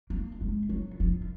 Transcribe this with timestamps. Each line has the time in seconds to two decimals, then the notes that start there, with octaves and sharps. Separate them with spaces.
0.10 A#3
0.41 G#3
0.69 F#3
1.00 F3